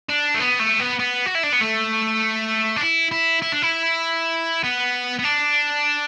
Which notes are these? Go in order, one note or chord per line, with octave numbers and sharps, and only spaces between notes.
D4
A3
B3
A3
B3
B3
F#4
E4
D4
B3
A3
D4
E4
E4
E4
D4
E4
B3
B3
D4